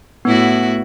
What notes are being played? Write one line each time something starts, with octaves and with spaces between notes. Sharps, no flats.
A2 B3 E4 F#4